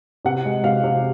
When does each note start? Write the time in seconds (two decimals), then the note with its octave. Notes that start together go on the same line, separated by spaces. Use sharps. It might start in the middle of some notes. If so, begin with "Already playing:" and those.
0.25 C3 F#5
0.45 G#3
0.64 C3 F5
0.84 C3